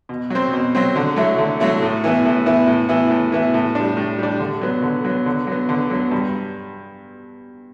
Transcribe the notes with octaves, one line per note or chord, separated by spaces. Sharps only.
B2
F#3 C4
B2
F#3 C4
D3
F#3 A3 E4
D3
F#3 A3 E4
A2
E3 B3 E4
A2
E3 B3 E4
A2
E3 B3 E4
A2
E3 B3 E4
A2
G3 D4
A2
G3 D4
D3
F#3 B3
D3
F#3 B3
D3
F#3 B3
D3
F#3 B3
G2